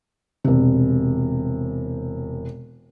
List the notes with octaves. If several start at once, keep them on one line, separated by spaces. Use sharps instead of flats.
E1 C3